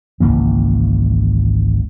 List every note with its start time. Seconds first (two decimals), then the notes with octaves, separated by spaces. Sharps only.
0.20 G#1 C#2 E3 A#3